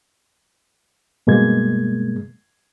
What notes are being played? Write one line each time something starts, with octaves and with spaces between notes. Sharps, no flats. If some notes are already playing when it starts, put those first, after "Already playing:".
G2 B2 G#3 A#3 G#6